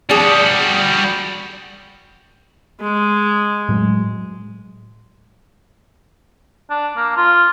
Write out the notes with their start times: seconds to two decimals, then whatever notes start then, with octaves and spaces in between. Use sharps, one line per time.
0.10 G3 D4 F#4 G#4
2.81 G#3
3.69 A2 F#3 G#3
6.70 D4
6.96 A#3
7.16 F4